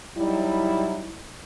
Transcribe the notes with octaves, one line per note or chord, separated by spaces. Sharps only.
F#3 G3 D#4 E4